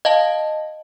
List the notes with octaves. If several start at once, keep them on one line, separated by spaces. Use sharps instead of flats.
D#5 F5 A5